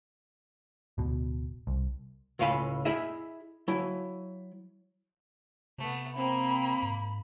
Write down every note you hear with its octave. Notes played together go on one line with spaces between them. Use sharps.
D1 B2
C2
C#2 A2 F5 G#5 B5
E4 G#4 D#5 E5
F#3 E4
C3 A3 B3
A#3 C4 B5
G#2